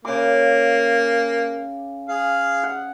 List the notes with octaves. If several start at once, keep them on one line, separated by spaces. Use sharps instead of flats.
C#3 A#3 D6
G#4 F5
F#5